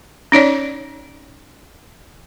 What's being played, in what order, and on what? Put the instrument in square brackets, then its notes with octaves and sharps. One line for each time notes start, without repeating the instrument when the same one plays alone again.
[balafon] C#4 D#4 C#5 D5